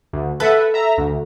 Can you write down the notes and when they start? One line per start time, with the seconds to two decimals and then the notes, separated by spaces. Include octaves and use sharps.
0.13 D2
0.40 A4 B4 E5 F#5
0.74 E5 A#5
0.98 D2